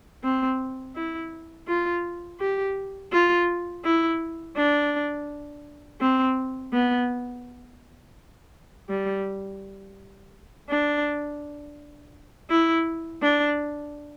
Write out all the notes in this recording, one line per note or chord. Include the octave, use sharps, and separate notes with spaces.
C4
E4
F4
G4
F4
E4
D4
C4
B3
G3
D4
E4
D4